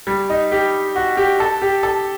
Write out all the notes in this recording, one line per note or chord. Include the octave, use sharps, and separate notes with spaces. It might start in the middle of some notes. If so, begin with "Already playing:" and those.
G3
D#4
G4
F#4
G4
A4
G4
A4